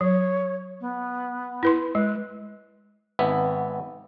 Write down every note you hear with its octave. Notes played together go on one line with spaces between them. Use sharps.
F#3 C#5
B3
E4 B4 C6
G#3 B4
G#1 B3 E5